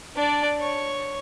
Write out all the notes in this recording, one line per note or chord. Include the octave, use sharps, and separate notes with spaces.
D4 D5
C#5 C#6